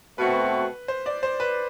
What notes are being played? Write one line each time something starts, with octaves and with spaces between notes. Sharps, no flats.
B2 A3 C4 F#4 B4
C5
D5
C5
B4